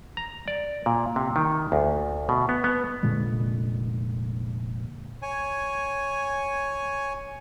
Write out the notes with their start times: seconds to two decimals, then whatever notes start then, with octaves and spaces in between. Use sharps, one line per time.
0.17 A#5
0.48 D5
0.86 A#2
1.16 C3
1.36 D#3
1.72 D2
2.29 B2
2.49 B3
2.64 B3
3.03 F1 A#2 D3 G#3
5.22 C#5 G#5